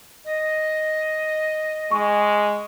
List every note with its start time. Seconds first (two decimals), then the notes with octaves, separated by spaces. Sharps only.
0.25 D#5
1.91 G#3 C#6